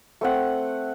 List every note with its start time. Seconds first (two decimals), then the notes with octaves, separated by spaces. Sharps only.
0.21 A3 C4 F#5